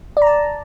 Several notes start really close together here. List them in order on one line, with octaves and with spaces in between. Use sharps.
D5 A#5 A5